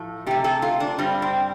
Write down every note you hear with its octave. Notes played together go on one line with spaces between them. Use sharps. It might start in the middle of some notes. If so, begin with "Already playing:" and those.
Already playing: A2 F3 A3
C3 A3 G4
A4
F4
D4
G2 G3 C4
C4